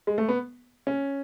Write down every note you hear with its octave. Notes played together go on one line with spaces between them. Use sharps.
G#3
A3
B3
C#4